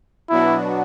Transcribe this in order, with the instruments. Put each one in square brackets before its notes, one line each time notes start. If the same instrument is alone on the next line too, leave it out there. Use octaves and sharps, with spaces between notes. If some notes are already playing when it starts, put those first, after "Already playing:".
[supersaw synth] B2 F#3 B3 D4 F#4 [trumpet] E4